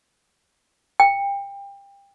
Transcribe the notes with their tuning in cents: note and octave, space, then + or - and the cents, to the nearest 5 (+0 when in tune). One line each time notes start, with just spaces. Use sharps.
G5 +25